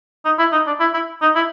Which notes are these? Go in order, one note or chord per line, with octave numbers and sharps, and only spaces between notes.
D#4
E4
D#4
D4
E4
E4
D#4
E4